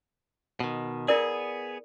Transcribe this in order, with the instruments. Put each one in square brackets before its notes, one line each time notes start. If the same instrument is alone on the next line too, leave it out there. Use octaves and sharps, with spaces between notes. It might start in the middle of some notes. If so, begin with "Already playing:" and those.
[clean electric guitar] B2 D#3
[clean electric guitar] B3 G#4 [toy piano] E4 A#4 D5